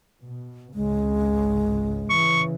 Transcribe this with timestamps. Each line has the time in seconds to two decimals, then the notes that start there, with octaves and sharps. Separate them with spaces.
0.21 B2
0.74 G#1 C#2 C#3 G#3
2.10 C#3 E3 C#6